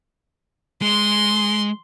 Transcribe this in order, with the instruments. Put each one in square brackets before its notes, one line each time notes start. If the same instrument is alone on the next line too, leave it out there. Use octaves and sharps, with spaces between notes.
[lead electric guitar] G#3 [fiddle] C6